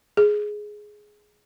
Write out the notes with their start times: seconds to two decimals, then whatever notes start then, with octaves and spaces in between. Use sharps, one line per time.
0.17 G#4